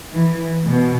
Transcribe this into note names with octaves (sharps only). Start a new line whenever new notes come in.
E3
B2